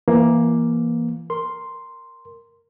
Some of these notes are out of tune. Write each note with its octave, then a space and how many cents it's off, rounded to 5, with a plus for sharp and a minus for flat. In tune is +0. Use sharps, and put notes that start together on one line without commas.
E3 +25 A#3 +10
A#4 -5 C6 +0